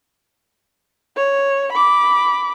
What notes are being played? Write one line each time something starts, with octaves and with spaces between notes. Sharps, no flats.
C#5
B5 D6